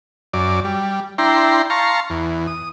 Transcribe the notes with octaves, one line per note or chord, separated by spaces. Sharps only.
F#2 D5
G3
D4 E4 G5 A#5 C6
F5 A5 A#5 C6 C#6
E2
D#6